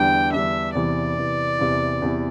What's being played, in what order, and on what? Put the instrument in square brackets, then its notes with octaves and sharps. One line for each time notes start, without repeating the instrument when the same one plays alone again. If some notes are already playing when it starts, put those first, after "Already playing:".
Already playing: [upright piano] E2 D3 G3 D4 [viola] G5
[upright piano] E2 D3 G3 D4 [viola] E5
[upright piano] E2 C3 E3 [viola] D5
[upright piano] E2 C3 E3
E2 C3 E3
E2 C3 E3